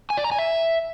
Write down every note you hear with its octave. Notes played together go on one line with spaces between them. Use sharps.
G#5
D5
A#5
G#5
E5